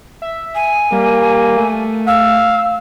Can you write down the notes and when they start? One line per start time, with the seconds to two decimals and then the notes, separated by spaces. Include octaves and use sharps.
0.22 E5
0.55 G#5
0.92 G3 A#3
1.57 A3
2.07 F5 E6